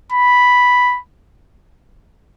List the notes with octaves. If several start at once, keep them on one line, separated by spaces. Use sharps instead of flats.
B5